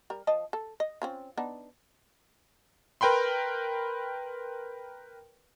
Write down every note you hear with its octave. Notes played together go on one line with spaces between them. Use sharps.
G3 A#4
F3 D#5 A5
A4
D#5
C4 C#4 F4
B3 D4 D#4
A#4 B4 G5 B5 C6